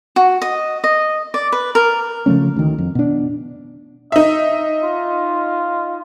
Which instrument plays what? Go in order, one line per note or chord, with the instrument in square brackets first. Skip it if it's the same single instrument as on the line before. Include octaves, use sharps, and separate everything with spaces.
[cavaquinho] F#4
D#5
D#5
D5
B4
A#4
[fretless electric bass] C#3 F3 A3 C#4
D2 D#3
F2
B2 D4
[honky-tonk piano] D#4 E5 [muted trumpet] D#5
[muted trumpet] F4